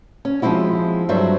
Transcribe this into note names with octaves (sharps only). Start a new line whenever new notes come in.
C#4
F3 G#3 C4 E4 F#4
G2 F#3 F#4 A4 C5 E5